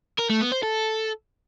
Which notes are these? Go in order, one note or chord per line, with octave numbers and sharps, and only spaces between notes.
A#4
A3
B3
C5
A4